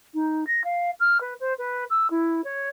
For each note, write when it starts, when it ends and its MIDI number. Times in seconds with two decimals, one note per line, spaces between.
0.14 0.44 63
0.47 0.63 94
0.64 0.90 77
1.00 1.20 89
1.20 1.34 71
1.40 1.53 72
1.58 1.84 71
1.90 2.07 88
2.10 2.44 64
2.44 2.69 73